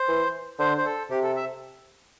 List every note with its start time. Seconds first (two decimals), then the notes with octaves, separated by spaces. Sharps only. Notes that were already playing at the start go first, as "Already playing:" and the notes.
Already playing: C5
0.08 E3
0.59 D3 C5
0.78 C5
0.85 A4
1.10 C3 G4
1.23 A4
1.36 E5